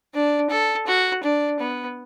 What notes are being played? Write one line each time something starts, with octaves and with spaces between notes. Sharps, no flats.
D4
A4
F#4
D4
B3